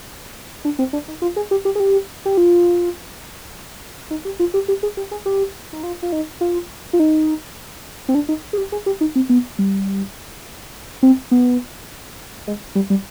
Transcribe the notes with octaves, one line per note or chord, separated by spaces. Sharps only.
D4
C4
D4
D#4
F4
G#4
G4
G4
G#4
G4
G4
F4
D#4
G4
F4
G4
G4
G#4
G4
G#4
G4
D#4
F4
F4
D#4
F4
F4
D#4
C4
D4
D#4
G#4
G4
G#4
G4
D#4
C4
B3
G3
C4
B3
G#3
G3
G3